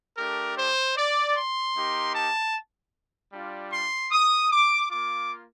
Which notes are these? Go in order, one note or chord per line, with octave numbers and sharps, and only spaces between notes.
A3 D4 G4 A#4
C5
D5
C6
A#3 D#4 G4
A5
G3 D4 F4
C6
D#6
D6
A#3 F4 D6